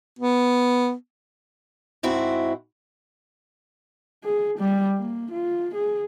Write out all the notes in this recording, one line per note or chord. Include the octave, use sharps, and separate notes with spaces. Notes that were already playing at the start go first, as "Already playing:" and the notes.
B3
G#2 C4 E4 F#4
G#4
G3
A#3
F4
G#4